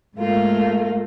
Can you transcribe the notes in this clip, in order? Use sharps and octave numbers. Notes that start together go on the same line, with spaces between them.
G#2 A3 A#3 F4